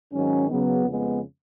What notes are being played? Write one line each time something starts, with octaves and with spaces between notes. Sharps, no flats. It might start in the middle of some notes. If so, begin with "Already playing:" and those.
G#2 D#3 F#3 C#4
C#3 F#3 B3
F2 C#3 G#3 B3